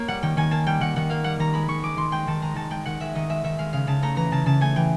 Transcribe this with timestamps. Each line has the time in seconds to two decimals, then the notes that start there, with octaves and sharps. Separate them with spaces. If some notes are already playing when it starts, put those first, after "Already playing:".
Already playing: A#3 C#5
0.08 G3 F#5
0.23 D#3 G5
0.37 D#3 G#5
0.51 A#3 A5
0.66 G3 G5
0.81 D#3 F#5
0.96 D#3 F#5
1.10 A#3 F5
1.24 G3 F#5
1.39 D#3 A#5
1.53 G#3 B5
1.69 D#3 C#6
1.83 G#3 D6
1.97 D#3 C6
2.12 G#3 G5
2.27 D#3 A5
2.42 G#3 A#5
2.55 D#3 A5
2.71 G#3 G5
2.85 D#3 F#5
3.00 G#3 E5
3.15 D#3 D#5
3.29 G#3 E5
3.44 D#3 E5
3.59 G#3 F5
3.73 C#3 F5
3.87 C#3 A5
4.02 A3 A#5
4.16 E3 A#5
4.32 C#3 A5
4.46 C#3 A5
4.60 A3 G#5
4.76 E3 G5